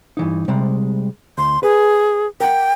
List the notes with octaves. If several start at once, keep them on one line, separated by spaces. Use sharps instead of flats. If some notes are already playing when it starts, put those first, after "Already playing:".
G2 E3 D#4
C3 G3 G#3
D2 C6
G#4 B4
A#4 F#5 G5